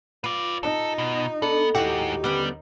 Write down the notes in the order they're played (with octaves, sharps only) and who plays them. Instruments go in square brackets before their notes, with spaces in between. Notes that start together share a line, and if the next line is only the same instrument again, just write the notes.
[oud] F4 [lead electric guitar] B4 D5
[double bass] D#4 [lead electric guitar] A4
[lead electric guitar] B2
[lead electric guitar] B3 [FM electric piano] D4 [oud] A4
[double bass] D#2 D#4 [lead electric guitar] G#2 F#5 [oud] E4 F#4 [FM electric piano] G4
[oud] D3 B3 C#4 [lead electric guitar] G3